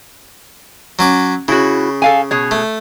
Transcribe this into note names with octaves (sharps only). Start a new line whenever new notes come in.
F#3 C#4 D6
C#3 E4 F#4
A4 F5 G#5
B2 G#4 C#5
A3